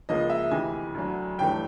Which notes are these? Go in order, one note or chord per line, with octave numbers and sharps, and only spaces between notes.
C#2 C#3 F3 A#3 D#5
E5
D2 C3 E3 G#5
D2 D3 F#3
G1 G2 E3 A3 G5